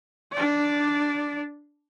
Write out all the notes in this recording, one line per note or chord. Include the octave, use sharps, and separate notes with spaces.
D4 D5